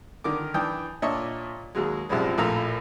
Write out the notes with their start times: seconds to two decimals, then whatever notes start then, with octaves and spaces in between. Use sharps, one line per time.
0.24 D3 D#3 A#4 D6
0.54 E3 D4 G5 D#6
1.02 A#2 D4 C#5 D#5 E5 C#6
1.75 D#2 F#3 G#3
2.09 C2 F#2 F3 G3 G#3
2.38 A#1 A2 F4 A4 A#5 E6